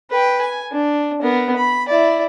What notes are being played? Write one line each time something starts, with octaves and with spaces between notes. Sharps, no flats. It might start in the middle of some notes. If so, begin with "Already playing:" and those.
B4 G5
G#5
D4
B3 A#4
B5
E4 D5